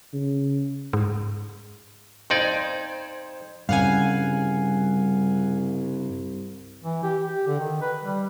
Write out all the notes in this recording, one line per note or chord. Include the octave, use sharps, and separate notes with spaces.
C#3
G#2
F2 D#4 C5 D5 G#6
C2 G2 C#3 F5 F#5 G#5
E3
G4
G4
D3
D#3
B4
G3